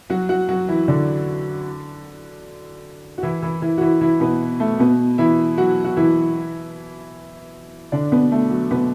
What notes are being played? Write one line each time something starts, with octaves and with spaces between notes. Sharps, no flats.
F#3 F#4
F#3 F#4
F#3 F#4
E3 E4
D3 D4
F#4
E3 E4
E3 E4
E3 E4
F#4
E3 E4
E3 E4
B2 B3
A3
B2 B3
E3 E4
F#3 F#4
F#4
E3 E4
D3 D4
B2 B3
A3
F#3
B2 B3